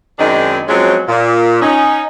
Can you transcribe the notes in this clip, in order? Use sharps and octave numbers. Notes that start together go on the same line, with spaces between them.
F#2 D#3 G#3 C4 D4 D#4
F3 F#3 G#3 C4 C#4
A#2
C#4 D#4